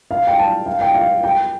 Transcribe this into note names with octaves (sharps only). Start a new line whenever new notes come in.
F5
G5
A5
F5
G5
F5
G5